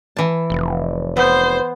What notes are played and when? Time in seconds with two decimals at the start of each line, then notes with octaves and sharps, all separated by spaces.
0.17 E3 A5
0.50 F1
1.17 B3 B4 C5